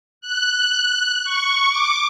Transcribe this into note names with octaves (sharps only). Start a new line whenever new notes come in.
F#6
C#6
D6